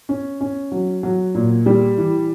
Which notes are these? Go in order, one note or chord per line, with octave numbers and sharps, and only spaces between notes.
C#4
C#4
F#3
F#3
A#2
G3
E3